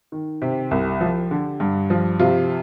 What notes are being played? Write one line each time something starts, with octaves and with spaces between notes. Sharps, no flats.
D#3
C3 G4
C2
F3
D3
G2
F3
C3 F4